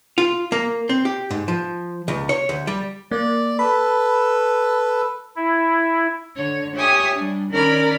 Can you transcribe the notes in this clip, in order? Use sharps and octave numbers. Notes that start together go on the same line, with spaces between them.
F4
A#3
C4
G4
G#2
F3
C#2
C#5
D2
G3
A#3 D5
A4 B4 B5
E4
D3 C#5
G4 C#5 E5 G#5 C#6 D#6
G3 D4
D#3 C#4 A#4 D5 B5 F6